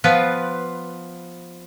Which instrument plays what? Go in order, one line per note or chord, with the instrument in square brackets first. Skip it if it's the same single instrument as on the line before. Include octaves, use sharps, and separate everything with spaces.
[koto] F3 B3 F4 B4